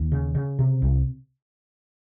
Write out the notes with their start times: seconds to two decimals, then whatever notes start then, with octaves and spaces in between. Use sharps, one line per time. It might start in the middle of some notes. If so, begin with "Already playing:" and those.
Already playing: D#2
0.12 C#3
0.35 C#3
0.59 C3
0.82 C2